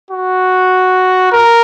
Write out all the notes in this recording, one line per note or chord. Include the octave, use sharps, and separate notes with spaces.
F#4
A#4